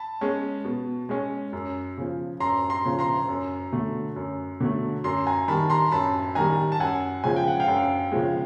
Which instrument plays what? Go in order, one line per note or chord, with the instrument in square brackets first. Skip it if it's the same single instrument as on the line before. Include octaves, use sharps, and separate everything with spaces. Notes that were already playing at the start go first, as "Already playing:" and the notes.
Already playing: [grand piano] A5 B5
[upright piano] G#3 C#4
B2
G#3 C#4
F#2
C#3 F3
[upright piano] F#2 [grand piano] A#5 C6
[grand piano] A#5 C6
[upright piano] C#3 F3
[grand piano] A#5 C6
[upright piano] F#2
D3 F#3 A3
F#2
D3 F#3 A3
[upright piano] F#2 [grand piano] A#5 C6
[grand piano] G#5 A#5
[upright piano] D#3 G3 [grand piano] A5 B5
[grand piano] A#5 C6
[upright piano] F#2 [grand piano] A5 B5
[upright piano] D#3 G3 [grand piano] G#5 A#5
[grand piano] A5
[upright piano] F#2 [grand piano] F#5 G#5
[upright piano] C#3 F3 G#3 [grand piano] G#5
[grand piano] G5
F#5
F5 G5
[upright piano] F#2
C#3 F3 G#3